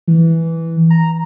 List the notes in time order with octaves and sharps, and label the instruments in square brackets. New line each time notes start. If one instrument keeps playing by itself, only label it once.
[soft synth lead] E3
A#5